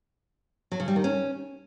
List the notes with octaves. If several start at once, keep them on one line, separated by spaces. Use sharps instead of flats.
F#3
C#3
G3
D#3
C#4